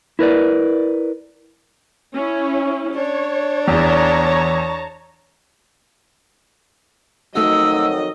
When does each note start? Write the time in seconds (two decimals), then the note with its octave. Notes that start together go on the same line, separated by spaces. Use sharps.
0.19 E4 A#4 B4 D5
2.13 C#4 E4
2.95 D4 C#5
3.68 E2 C#5 A5 A#5
7.35 F2 D#3 F#3 A3 D#4 F#4 D#5 E6